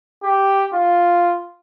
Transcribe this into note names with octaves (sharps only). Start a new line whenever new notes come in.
G4
F4